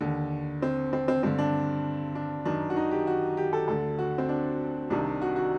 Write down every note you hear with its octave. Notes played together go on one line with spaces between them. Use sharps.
D#2 D3
C4
C4
C4
G2 D3 C4
D4
D4
F#2 D#3 D4
F#4
D#4
G4
F#4
G4
A4
D2 D3 A4
F#4
C4
D4
C2 C3 D#3 D4
F#4
F#4